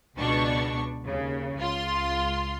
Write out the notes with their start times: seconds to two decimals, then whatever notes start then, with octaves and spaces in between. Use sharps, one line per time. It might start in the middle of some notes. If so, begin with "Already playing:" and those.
0.18 C#2 B2 D4 C#6
1.07 D#2 C#3
1.58 C#2 F4 C6